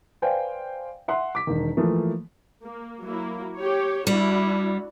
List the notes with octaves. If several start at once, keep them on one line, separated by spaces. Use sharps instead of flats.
B4 C5 D5 F5 G5 G#5
E5 F#5 C6
D6 B6
E1 D#3
E3 F3 A3 A#3
A#3
F#3 A#3 E4
G4 C#5
G3 D4 E4 F#4